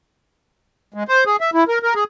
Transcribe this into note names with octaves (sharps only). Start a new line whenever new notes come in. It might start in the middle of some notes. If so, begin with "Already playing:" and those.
G#3
C5
G#4
E5
E4
A#4
A#4
G#4